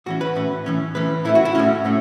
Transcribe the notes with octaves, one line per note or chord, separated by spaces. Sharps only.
A2 E3 C#4 F#4
B4
A2 E3 C#4
A2 E3 C#4
A2 E3 C#4 B4
A2 A3 C#4 E4
F#4
E4
A2 A3 C#4 F#4
A2 A3 C#4